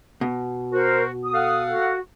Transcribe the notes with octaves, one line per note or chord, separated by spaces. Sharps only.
B2
F#4 A#4 C5
D#6
A4 F5 F#5
F#4